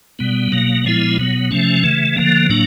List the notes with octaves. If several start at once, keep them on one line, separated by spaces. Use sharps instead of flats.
B2 G3 B3
B2 F#3 A#3
A#2 F3 G#3 B3 E4
B2 F#3 B3
C3 F3 A3 C#4
C#3 E3 A3
D3 F3 A#3
A2 F#3 A#3 D4